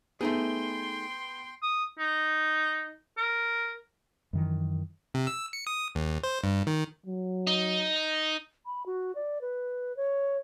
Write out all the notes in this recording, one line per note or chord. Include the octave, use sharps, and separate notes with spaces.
A3 B3 D#4 G#4 G5 C6
D#6
D#4
A#4
F#2 D#3 E3
C3
E6
C#7
D#6
D#2
C5
G2
D#3
F#3
D#4
B5
F#4
D5
B4
C#5